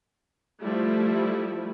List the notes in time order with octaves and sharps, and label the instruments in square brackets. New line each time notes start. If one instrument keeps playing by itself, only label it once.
[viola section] F3 G3 A3 E4